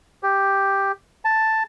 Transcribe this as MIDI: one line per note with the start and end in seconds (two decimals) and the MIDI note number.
0.23 0.92 67
1.25 1.63 81